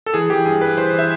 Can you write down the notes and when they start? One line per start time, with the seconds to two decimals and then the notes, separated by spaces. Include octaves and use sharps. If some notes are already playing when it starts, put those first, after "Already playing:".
0.06 A4
0.14 E3 G#4
0.30 E3 G4
0.45 G2 G#4
0.61 G2 B4
0.77 E3 C5
0.93 E3
0.99 E5